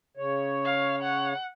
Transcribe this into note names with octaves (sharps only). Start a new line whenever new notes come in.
C#3 C#5
F5
F#5